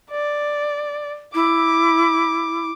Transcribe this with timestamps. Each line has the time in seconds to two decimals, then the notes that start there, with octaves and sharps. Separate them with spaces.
0.10 D5
1.35 E4 D6